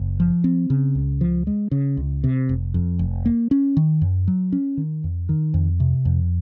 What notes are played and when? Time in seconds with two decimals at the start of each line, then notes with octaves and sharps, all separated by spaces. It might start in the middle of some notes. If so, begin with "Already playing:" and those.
Already playing: F#1
0.20 F3
0.44 C4
0.70 C#3
0.95 C#2
1.21 F3
1.47 G#3
1.71 C#3
1.97 C#2
2.24 C3
2.49 F1
2.74 F2
2.99 F1
3.25 A#3
3.51 C#4
3.77 D#3
4.02 F#2
4.28 F#3
4.52 C#4
4.77 D#3
5.04 F2
5.29 D#3
5.54 F2
5.80 C3
6.05 F2